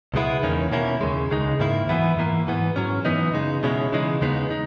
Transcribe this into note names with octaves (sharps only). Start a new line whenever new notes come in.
C#2 B2 G#3 B3 E4
E2 D#3 A#3 C#4
B2 A#3 C#4 E4
D#2 C#3 G#3
C#2 C#3 G#3 D#4
G#2 D#3 A#3 E4
F#2 E3 B3 E4
G#2 E3 A#3
G#2 E3 B3
G#2 F#3 C#4
F#2 E3 B3 D#4
C#3 G#3 D#4
B2 G#3 C#4 E4
C#3 E3 G#3 D#4
D#2 C#3 G#3 B3 D#4
D#4